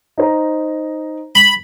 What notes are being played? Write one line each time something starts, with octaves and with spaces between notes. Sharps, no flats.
D#4 C5 A#5
B5